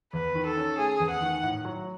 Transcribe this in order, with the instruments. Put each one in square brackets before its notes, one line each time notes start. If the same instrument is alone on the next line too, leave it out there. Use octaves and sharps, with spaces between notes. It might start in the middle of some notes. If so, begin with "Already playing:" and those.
[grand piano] E2 [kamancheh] B4
[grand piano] D#3
[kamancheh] A4
[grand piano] C#4
[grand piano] A3 [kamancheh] G#4
[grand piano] E2
[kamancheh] F#5
[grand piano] D#3
A2
F#3